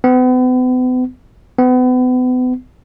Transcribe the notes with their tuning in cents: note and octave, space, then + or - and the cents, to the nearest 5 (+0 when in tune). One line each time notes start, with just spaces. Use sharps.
B3 +40
B3 +35